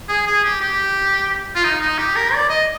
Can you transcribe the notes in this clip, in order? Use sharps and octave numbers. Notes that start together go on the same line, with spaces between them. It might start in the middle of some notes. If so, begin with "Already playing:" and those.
G#4
G#4
G4
G4
F4
D#4
D#4
G4
A#4
D5
D#5